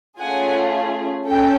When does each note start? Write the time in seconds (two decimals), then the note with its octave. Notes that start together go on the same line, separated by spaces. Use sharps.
0.19 A3 C#4 F4 G#4 F#5 G#5
1.27 C#4 A4 G5